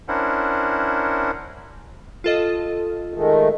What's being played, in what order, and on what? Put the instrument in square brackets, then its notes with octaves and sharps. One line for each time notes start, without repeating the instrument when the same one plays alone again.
[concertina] C#4 D4 E4 A#4 C5 F#5
[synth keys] F4 A4 D#5
[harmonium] D#3 G#3 A3